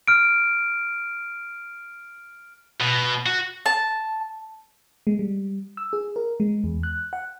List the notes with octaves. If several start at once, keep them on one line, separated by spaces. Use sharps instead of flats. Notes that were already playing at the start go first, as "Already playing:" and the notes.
F6 D7
B2
F#4
A5
G#3
G3
E6
G#4
A#4
G#3
E2
F#6
F#5